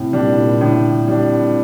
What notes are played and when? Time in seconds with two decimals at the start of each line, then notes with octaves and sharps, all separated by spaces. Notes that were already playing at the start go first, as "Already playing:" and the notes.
Already playing: A2 C3
0.13 A#2 G3 D4
0.37 A#2
0.61 A2 D3
1.08 G3 D4